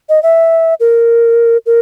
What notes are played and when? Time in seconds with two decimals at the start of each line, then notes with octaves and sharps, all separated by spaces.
0.09 D#5
0.23 E5
0.80 A#4
1.66 A#4